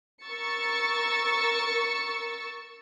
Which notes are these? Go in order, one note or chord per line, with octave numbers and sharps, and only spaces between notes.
A#4 C#6 E6 A6 C#7